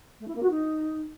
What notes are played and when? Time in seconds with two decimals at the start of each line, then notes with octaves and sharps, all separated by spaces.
0.20 A3
0.27 E4
0.35 A#3
0.42 F#4
0.50 D#4